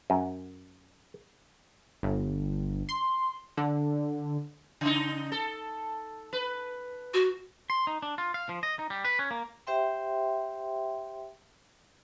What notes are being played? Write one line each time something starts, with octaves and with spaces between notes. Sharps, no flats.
F#2
G1
C6
D3
C#3 D#4
A4
B4
F#4
C6
D#4
D4
F4
F5
F3
D#5
D#4
G3
B4
C#4
A#3
G4 C5 E5 G5 C6